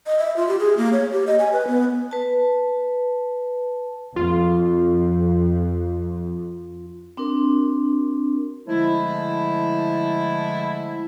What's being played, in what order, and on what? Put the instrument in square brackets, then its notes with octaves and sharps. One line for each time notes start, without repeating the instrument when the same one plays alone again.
[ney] D#5
E5
F4
G4
G#4
A#3
C#5
G4
D#5
G#5
B4
B3
[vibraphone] B4 A5
[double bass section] F2 [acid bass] F4
[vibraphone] C4 D4 F#4 A#4
[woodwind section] D3 F3 G#3 A3 E4